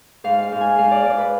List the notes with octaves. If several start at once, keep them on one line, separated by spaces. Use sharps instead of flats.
G#2 F5
F5
G#2
G#5
G#2 F5
D5
G#2 D5
B4